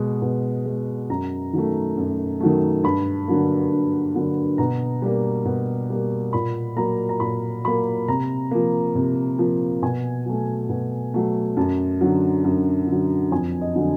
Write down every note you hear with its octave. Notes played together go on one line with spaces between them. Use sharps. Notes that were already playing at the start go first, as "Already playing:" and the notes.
Already playing: B2 G#3
B2
G#3
F#2 A#5
D#3 F#3 A3
F#2
D#3 F#3 A3
G2 B5
D3 F#3 A#3
G2
D3 F#3 A#3
B2 A#5
G3 A#3
B2
G3 A#3
A#2 B5
F#3 A#3 A#5
A#5
A#2 B5
F#3 A#3 B5
C3 A#5
F3 A#3
C3
F3 A#3
B2 G#5
F#3 A3
B2
F#3 A3
F#2 A5
D3 F#3
F#2
D3 F#3
F2 G#5
D#5
D3 F#3